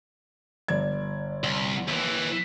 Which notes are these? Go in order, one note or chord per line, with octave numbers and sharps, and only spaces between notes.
G1 D5 G#6
C2
D#2 E3